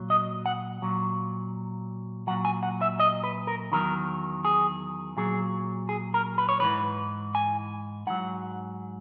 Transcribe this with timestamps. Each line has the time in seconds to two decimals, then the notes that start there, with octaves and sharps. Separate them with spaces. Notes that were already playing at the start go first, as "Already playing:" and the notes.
Already playing: A#2 F#3
0.10 D#5
0.46 F#5
0.82 A#2 F#3
2.27 F#3 F#5
2.30 A#2
2.45 G#5
2.63 F#5
2.81 E5
3.00 D#5
3.24 B4
3.47 A#4
3.72 E2 D#3 F#3 A#4
4.45 G#4
5.17 A#2 F#3 G#4
5.89 G#4
6.14 A#4
6.38 B4
6.49 C#5
6.60 G#2 E3 B4
7.35 G#5
8.07 G#2 F#3 F#5